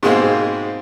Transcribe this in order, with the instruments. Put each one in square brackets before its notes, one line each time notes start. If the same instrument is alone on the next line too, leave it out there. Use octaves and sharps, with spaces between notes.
[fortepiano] G#2 B2 G#3 A#3 C4